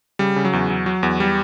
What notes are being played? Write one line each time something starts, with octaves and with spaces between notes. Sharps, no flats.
C#3 G3
C#3
F#3
E2
F#3
F#3
E2
G3